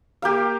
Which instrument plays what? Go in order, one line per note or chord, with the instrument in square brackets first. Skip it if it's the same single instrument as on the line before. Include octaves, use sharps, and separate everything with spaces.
[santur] A#3 G4 A#4 F5